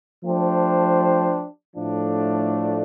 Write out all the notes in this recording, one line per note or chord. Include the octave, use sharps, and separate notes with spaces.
F3 A3 D4 G4 C5
A2 F3 A3 D4